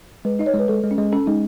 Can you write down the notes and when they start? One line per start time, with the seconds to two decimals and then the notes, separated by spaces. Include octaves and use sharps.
0.25 G#3 B4
0.39 D#4 D#5
0.46 C#5
0.54 G#3
0.59 B4
0.68 G#3 A4
0.84 G#3
0.91 C#4
0.98 G#3
1.12 C#4 A4
1.26 G#3 D#4